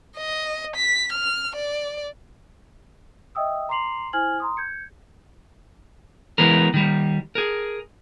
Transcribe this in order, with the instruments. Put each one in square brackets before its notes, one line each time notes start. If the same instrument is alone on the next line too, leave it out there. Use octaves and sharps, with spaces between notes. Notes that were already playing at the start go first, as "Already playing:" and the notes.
[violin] D#5
B6
F6
D5
[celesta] D#5 E5 G5 D#6 E6
A#5 C6 D6 C7 F7 F#7
E4 C5 G#5 F6 G#6 F#7
A#5 C6 D#6
G6 G#6 C#7
[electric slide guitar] E3 G#3 B3 A#4
D#3 G3
G#4 A#4